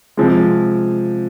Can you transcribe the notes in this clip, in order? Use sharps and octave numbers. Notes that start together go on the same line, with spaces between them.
C3 F3 G#3